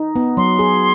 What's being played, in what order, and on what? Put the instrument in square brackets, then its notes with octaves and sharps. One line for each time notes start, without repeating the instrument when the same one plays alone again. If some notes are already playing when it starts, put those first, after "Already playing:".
Already playing: [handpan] D#4
B3
[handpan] F#3 [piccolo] C6
[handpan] G#4